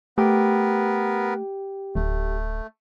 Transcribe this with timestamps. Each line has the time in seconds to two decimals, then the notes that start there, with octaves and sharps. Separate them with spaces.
0.18 A3 B3 G4 A#4 B4 G5
1.95 D1 A3